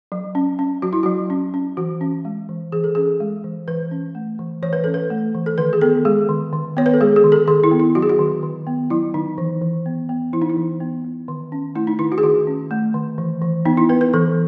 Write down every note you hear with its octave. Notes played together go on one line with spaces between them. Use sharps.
F#3
C#4
C#4
F#3 F#4
E4
F#3 F#4
C#4
C#4
E3 F#4
C#4
G#3
E3
E3 G#4
A4
C#4 G#4
G#3
E3
E3 B4
C#4
A3
E3
E3 C#5
B4
C#4 A4
B4
A3
E3
A4
D#3 B4
G#4
B3 A4
G#3 G#4
D#3
D#3
B3 C#5
B4
A4
G#3 G#4
G#4
D#3
A4
D#3 G#4
E4
B3
E4
F#3 F#4
G#4
F#4
D#3
D#3
B3
F#3 E4
D#3 D#4
E3
E3
B3
B3
E3 E4
D#4
E4
E3
B3
B3
D#3
C#4
A3 E4
D#4
D#3 E4
F#4
G#4
D#3 F#4
C#4
A3
D#3
E3
E3
B3 D#4
E4
B3 B4
B4
E3 A4